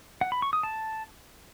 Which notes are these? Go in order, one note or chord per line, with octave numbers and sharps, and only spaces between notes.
F#5
B5
C#6
D#6
A5